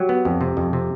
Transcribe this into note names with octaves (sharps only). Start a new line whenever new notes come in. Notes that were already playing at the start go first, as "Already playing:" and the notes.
Already playing: F#3 G4
B3
F2
C3
F2
C3